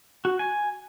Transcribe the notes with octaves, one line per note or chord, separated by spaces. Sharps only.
F#4
G#5